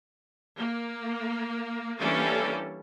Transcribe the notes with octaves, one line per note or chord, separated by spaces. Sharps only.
A#3
E3 G3 A#3 C#4 D4 A4